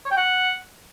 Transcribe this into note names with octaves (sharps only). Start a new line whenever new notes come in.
C#5
G5
F#5